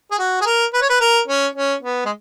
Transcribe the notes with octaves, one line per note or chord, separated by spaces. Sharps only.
G#4
F#4
G#4
A#4
B4
C#5
B4
A#4
C#4
C#4
B3
G#3